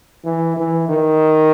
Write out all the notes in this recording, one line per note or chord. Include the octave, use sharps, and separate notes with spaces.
E3
E3
D#3